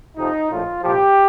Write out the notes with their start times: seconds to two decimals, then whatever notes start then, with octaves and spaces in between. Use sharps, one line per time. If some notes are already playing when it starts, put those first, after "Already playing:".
0.17 F2 C3 F3 D#4
0.50 A#1 A2 F3 F4
0.83 C2 A#2 F3 G4